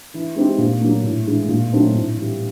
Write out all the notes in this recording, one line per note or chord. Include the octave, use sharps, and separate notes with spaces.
E3
G#3 C4 D#4 G4
A#2
F#3 A#3
A2
E3 G#3
A#2
F#3 A3 C4 D#4
A2
E3 G3